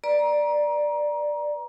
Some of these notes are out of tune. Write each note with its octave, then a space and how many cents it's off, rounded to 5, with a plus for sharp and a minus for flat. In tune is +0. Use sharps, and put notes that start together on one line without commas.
B4 -5 D5 +10 A#5 +25